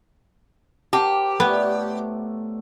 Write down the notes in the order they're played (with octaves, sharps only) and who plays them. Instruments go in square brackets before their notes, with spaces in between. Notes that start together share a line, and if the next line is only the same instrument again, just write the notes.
[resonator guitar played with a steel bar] G4 [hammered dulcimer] A#4 C5 [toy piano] F#5 A5 D6
[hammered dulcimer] A2 A3 D5 [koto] B3